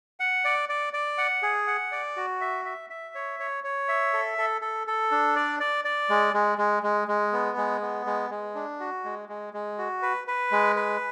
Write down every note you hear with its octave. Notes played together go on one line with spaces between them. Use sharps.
F#5
D5
D5
D5
F#5
G#4
F#5
D5
F#4
E5
E5
E5
C#5
C#5
C#5
E5
A4
A4
A4
A4
D4
D5
D5
D5
G#3
G#3
G#3
G#3
G#3
B3
G#3
B3
G#3
G#3
D4
F#4
G#3
G#3
G#3
F#4
B4
B4
G#3
B4